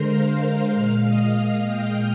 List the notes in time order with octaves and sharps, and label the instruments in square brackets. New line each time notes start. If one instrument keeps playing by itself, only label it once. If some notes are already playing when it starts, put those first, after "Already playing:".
Already playing: [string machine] D3 G#3 A#4 C5 A#5 C6
F5 F6
F5 F6
A#2 G#3
D#5 D#6
G5 G6